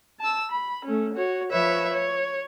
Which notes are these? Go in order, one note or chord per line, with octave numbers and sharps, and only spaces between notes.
A5 E6
B5
A3 C#4
F#4 C#5
F3 B4 C#5 E5
C#5